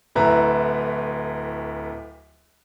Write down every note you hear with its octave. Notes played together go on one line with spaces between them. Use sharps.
D1 D2 B4 E5 A#5